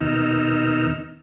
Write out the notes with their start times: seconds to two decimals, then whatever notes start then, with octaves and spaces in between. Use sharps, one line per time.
0.01 D#2 B2 D#3 D#4 E6 F6